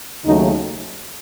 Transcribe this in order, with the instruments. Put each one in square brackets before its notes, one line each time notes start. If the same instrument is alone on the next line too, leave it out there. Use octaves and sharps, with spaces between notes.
[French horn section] D#2 C#3 F#3 A3 D#4